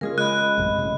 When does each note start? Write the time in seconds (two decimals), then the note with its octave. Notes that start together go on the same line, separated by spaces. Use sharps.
0.01 C#3 G#3 F4 G#4 A#4
0.18 D#5 B5 F#6
0.57 A1 F#2 C3
0.79 A2 C#3